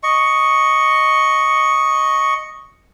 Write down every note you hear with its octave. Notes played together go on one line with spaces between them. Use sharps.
D#5 C#6